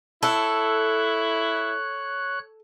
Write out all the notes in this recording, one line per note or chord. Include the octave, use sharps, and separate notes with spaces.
E4 A4 C#5 F#6